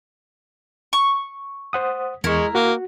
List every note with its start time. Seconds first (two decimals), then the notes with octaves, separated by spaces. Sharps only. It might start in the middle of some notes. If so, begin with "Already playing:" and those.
0.93 C#6
1.73 C5 F#5 D#6
2.24 E2 G#3 E4 A#4 C#6
2.55 A#3 F#4